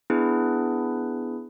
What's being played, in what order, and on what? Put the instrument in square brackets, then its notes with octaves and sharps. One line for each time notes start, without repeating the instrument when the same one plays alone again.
[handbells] B3 D4 E4 G#4 B4